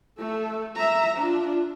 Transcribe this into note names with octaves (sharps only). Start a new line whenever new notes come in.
A3 A4
E5 A#5
D4 F4